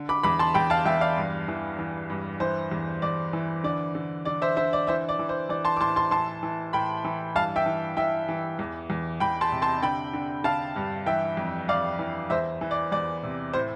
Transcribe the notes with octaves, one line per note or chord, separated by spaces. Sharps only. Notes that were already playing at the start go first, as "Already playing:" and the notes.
Already playing: D3
B5 D6
E2 B5 D6
A5 C6
E2 G5 B5
F5 A5
E2 E5 G5
D5 F5
G2
E3
E3
G2
E3 C5
E2
E2 D5
E3
D3 D5
D3
D3 D5
C5 E5
D3 C5 E5
D5
E3 C5 E5
D5
E3
C5
E3 D5
A5 C6
D6
A2 A5 C6
A5 C6
E3 A5 C6
E3
A2 G5 B5
E3
G2 F5 A5
E5 G5
E3
E3 E5 G5
E3
E2
E2
E2 G5 B5
A5 C6
C3
A5 C6
D3 G5 B5
D3
D3 F5 A5
G2
E3 E5 G5
F2
F2 D5 F5
E3
E2 C5 E5
E3
D5
E2 D5
C3
A2 C5